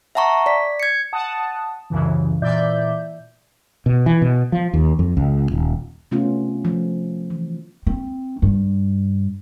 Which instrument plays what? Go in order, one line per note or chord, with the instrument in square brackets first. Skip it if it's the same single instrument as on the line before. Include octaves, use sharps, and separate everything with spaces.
[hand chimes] E5 F#5 A5 A#5 C#6
D5 B6
G#6 C#7
[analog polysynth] F#5 A5 D#6
C2 F#2 C#3 E3
A#2 E3 D5 E5 G6
[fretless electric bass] B2
E3
B2
F3
D#2
F2
C#2
D#1
[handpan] C3 A3 B3 C#4 F4
F3 A3
E3
[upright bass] C4
G2